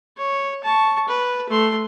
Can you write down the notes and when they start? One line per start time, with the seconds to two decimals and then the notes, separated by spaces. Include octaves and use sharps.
0.17 C#5
0.63 A5 C#6
1.08 B4
1.49 A3 C6